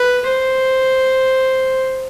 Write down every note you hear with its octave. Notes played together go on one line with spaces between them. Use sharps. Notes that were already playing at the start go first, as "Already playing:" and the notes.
Already playing: B4
C5